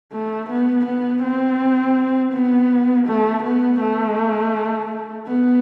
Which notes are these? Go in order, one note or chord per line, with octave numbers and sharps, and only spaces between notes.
A3
B3
B3
C4
B3
A3
B3
A3
B3